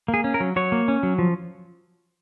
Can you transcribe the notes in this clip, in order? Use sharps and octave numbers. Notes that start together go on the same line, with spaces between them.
A#3
G#4
C#4
A#4
F#3
F#3 C#5
A#3
C#4
F#3
F3